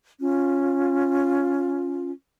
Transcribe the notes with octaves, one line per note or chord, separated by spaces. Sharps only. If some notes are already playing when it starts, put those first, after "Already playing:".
C#4 F4